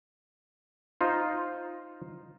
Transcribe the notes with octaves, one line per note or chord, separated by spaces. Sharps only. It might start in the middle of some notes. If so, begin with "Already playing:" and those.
D#4 F4 C5